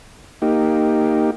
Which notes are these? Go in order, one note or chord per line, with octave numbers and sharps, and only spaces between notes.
A#3 D#4 G4